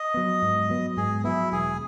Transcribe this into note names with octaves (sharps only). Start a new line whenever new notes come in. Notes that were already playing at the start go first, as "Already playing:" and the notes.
Already playing: D#5
F#3 B3
G#2
F#3 B3
G#2 G#4
F#3 B3 E4
E1 G#4